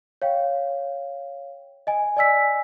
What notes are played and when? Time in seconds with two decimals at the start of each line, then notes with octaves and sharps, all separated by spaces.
0.22 C#5 F5 G5
1.87 D#5 G#5
2.17 D5 D#5 G#5 E6 B6